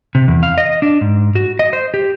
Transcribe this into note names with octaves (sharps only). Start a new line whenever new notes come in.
C3
E2
F5
D#5
D4
G#2
F#4
D#5
C5
G4